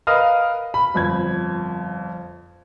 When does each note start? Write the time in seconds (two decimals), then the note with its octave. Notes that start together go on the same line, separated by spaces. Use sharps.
0.07 A#4 B4 D#5 F5 D#6 F6
0.74 B5
0.94 G1 F2 G#6